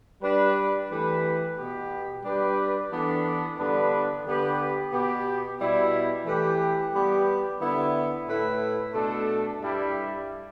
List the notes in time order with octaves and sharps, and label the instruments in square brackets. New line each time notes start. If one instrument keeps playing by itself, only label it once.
[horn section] G3 D4 B4
E3 A3 G4 B4
B2 B3 G4
G3 D4 G4 B4
E3 B3 D4 A4
G2 D3 B3 D4 B4
D3 B3 G4 B4
B2 B3 G4
B2 G3 E4
E3 A3 G4 B4
G3 B3 G4 B4
D3 B3 E4
A2 A3 E4 B4
B2 A3 D4 A4
G2 G3 E4